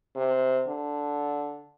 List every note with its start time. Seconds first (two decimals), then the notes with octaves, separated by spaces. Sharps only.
0.16 C3
0.68 D3